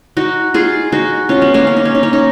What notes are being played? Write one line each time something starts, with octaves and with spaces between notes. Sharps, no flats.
D#4 F#4
F4 G#4
D#4 F#4
C#4 F4
B3 D#4
A#3 C#4
C#4
D#4
C#4
D#4
C#4
D#4